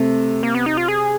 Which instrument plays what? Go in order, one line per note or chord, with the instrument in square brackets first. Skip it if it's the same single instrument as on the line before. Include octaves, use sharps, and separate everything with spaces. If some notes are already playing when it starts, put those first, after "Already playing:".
Already playing: [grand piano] C3 [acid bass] A3
[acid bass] A#3
B3
D#4
F4
G#4